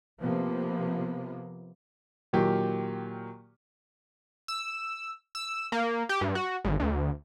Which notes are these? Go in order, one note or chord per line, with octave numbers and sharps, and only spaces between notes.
C3 F3 A#3 B3
A#2 D#3 F#3 G4
E6
E6
A#3
G4
G2
F#4
G#1
D2